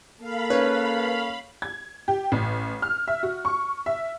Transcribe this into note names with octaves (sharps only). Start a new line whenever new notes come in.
A#3 A4 F5 B5
C#4 B4
G#6
G4
A1
F6
E5
F#4
C#6
E5